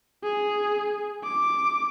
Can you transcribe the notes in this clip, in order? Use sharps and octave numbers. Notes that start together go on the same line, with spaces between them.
G#4
D6